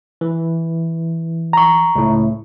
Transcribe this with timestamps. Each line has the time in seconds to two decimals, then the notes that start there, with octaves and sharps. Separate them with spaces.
0.21 E3
1.53 A#5 C#6
1.95 C#2 A2